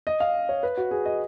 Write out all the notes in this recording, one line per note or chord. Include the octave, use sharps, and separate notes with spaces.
D#5
F5
C#5
B4
F#4
G#4
D#5